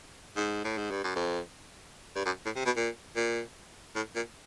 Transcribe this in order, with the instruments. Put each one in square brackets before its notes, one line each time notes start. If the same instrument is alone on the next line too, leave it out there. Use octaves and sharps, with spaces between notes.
[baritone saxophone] G#2
A2
G#2
G2
F#2
F2
G2
F#2
A2
C3
B2
A#2
A#2
A2
A#2